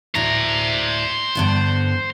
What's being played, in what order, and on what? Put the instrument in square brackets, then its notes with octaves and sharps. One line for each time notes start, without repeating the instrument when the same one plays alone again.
[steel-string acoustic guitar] D2 A2 D4 [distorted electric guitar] C5 A#5
[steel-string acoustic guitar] G2 D3 B3